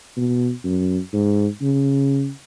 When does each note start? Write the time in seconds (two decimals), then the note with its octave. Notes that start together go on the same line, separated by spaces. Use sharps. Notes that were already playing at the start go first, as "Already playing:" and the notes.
0.17 B2
0.64 F#2
1.13 G#2
1.62 C#3